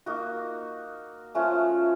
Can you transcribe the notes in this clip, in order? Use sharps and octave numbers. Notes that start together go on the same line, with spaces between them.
A#3 D#4 F#4
F3 A3 C#4 F#4